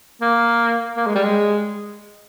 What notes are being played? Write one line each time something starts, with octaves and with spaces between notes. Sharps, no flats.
A#3
A#3
G#3
G3
G#3